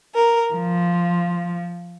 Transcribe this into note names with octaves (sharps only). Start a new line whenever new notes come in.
A#4
F3